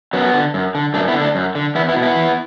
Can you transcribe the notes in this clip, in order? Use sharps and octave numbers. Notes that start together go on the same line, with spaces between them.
F#2 F#3 B3
D3
F#2
D3
F#2 A3 D4
B3 E4
D3
A3 D4
F#2
D3
E2 B3 E4
B3 E4
B2
B3 E4
E2